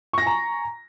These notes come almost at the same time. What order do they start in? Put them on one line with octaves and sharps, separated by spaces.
C#6 A#6 G#5 A#5